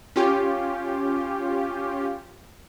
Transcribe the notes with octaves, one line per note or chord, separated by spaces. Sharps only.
C#4 F4 G4